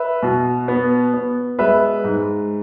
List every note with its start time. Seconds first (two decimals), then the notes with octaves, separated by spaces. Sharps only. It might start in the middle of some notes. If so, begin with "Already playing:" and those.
Already playing: B4 E5
0.23 B2
0.68 B3
1.14 B3
1.59 G#3 B4 E5
2.04 G#2